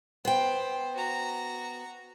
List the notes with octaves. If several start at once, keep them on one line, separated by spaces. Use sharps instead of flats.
B3 C5 G5
F#4 A#5